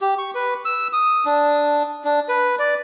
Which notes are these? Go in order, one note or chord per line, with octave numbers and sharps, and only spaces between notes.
G4
C#6
B4
E6
D#6
D4
D4
B4
D5